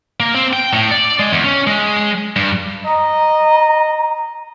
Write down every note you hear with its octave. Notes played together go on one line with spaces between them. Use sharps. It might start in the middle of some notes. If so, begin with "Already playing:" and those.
A#3
C4
G5
A2
D5
G#3
E2
C#4
G#3
G2
D#5 A#5